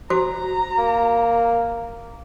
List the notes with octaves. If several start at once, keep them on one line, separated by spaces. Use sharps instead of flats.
F#4 C5 A#5 D6
A#3